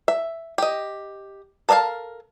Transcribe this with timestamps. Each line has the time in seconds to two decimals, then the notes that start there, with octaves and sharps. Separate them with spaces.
0.08 E5
0.58 G4 D#5
1.69 A4 A#4 D#5 F5 A5